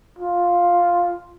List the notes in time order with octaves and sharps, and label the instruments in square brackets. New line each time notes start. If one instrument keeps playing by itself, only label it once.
[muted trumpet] F4